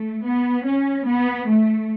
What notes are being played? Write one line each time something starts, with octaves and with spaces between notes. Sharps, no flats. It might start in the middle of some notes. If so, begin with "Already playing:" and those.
Already playing: A3
B3
C#4
B3
A3